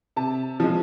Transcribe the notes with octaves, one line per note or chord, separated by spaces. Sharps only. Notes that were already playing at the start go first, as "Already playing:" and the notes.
C3 A5
F3 G#3